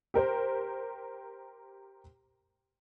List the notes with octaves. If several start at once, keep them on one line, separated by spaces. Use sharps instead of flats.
G4 A#4 C5